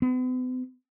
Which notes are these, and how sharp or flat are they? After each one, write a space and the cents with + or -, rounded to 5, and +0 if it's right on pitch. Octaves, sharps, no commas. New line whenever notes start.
B3 +45